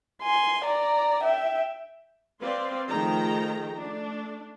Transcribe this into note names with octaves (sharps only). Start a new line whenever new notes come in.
G#5 C6
D5 A#5
E5 G5
C4 B4 D5 F5 C6
D#3 F3 A3 G#4 G5 A#5
A3 D4